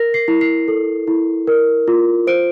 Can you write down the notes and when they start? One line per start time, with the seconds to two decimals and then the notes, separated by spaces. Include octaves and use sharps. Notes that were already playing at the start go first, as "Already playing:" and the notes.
Already playing: A#4 A#6
0.14 C7
0.28 E4
0.41 C7
0.68 A4
1.07 E4
1.47 A#4
1.88 F4
2.27 C5 D7